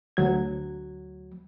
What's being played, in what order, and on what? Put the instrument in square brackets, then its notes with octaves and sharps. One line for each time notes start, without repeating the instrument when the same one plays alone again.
[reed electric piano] D2 F#3 G#6